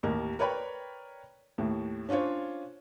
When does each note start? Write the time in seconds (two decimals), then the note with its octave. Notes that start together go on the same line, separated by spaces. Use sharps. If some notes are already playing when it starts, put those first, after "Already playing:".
0.03 A1 D#2 A#4
0.39 A#4 B4 C#5 D5 G5 B5
1.58 D#2 A2
2.09 C#4 D4 F4 C5 C#5